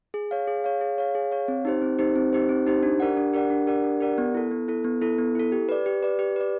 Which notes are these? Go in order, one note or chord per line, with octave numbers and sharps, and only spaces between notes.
G#4
C#5 F5
G#4
C#5 F5
G#4
C#5 F5
G#4
C#5 F5
C4
D#4 G4 C5
C4
D#4 G4 C5
C4
D#4 G4 C5
C4
D#4 G4 C5
D4
G4 A#4 D5 F#5
D4
G4 A#4 D5 F#5
D4
G4 A#4 D5 F#5
D4
G4 A#4 D5 F#5
B3
E4 A4
B3
E4 A4
B3
E4 A4
B3
E4 A4
G4
B4 D5
G4
B4 D5
G4
B4 D5